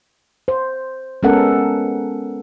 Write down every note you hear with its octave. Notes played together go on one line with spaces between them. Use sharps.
C5
G#3 B3 C#4 A4 A#4 F#5